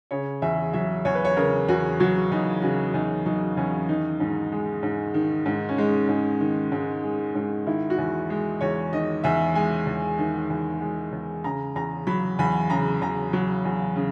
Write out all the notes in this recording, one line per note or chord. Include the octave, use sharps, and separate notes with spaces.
C#3 C#5
E2 E5
F#3 E5
E2 C#5
B4
C#5
C#3 A#4
E2 F#4
F#3 F#4
E2 D#4
C#3 F#4
E2 D#4
F#3 D#4
E2 C#4
D#3 D#4
G#2
G#3
G#2
D#3
G#2
C#4
G#3 D#4
G#2
D#3
G#2
G#3
G#2
D#3 E4
F#4
E2
G#3
E2 C#5
D#3 D#5
E2 E5
G#3 G#5
E2
D#3
E2
G#3
E2
C#3 A#5
E2 A#5
F#3 B5
E2 B5
C#3 A#5
E2 A#5
F#3
E2
C#3